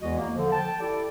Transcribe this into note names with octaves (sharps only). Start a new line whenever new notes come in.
E2 E3 G#3 E4 F#4 D#5
A#3
D3 F3
G5 A5
E4 G4 A4 D5